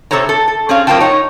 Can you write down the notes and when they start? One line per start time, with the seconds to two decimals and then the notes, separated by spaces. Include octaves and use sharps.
0.11 C3 G#3 A4 C5 C#5 A#5
0.29 A4
0.48 A4
0.69 C4 C#4 G#4 C#5 F5
0.87 F#2 A#3 C4 F4 G5 A5
1.01 D#4 C#5